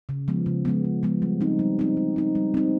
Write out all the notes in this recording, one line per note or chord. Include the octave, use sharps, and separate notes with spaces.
C#3
F3 G#3 B3
C#3
F3 G#3 B3
C#3
F3 G#3 B3
G3
C4 D#4
G3
C4 D#4
G3
C4 D#4
G3
C4 D#4